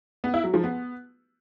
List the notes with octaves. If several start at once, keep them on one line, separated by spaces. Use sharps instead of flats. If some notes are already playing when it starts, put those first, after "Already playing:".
B3
E4
F#3
F3
B3